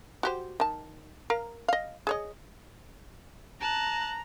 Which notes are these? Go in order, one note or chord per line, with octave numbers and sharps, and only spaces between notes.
F#4 G4 C5
D#3 A5
A#4 F5 A#5
D#5 F5
G#4 C#5 D#5
A5 A#5 F#6